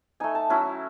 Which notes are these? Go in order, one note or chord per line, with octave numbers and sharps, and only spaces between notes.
A3 D#4 G#5
A5
F#3 C#4 E4